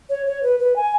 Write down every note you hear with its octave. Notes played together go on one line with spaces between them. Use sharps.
C#5
C#5
B4
B4
G#5